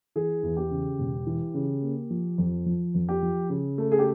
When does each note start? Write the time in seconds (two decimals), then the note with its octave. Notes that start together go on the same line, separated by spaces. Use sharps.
0.16 E3 G#4
0.43 E2
0.57 G4
0.71 C#3
0.99 E1
1.27 E3
1.54 C#3
1.82 A#3
2.10 F3
2.38 F2
2.66 F3
2.94 F2
3.09 G4
3.23 F3
3.50 C#3
3.78 A3
3.92 G#4
3.99 G4